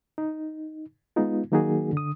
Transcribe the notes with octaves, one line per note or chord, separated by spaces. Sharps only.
D#4
G#3 B3 D#4 F4
D#3 F#3 A#3 D#4 F#4 G#4
D3 D#6